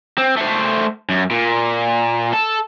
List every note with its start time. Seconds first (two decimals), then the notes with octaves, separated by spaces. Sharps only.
0.18 C4
0.37 A3 C5
1.09 F#2
1.31 A#2
2.33 A4